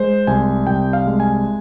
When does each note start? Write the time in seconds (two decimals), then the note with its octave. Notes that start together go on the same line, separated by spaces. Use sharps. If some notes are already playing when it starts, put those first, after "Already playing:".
Already playing: G#3 C5
0.27 C2 G#5
0.67 C2 G5
0.93 F5
1.07 G#3
1.20 G#5